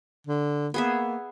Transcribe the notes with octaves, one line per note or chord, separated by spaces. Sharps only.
D3
A#3 B3 G#4 E5